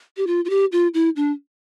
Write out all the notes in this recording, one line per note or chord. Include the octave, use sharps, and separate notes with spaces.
G4
F4
F4
G4
F4
E4
D4